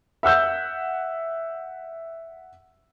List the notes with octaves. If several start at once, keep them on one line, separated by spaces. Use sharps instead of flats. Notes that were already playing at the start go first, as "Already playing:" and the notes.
E5 F#5 E6 G6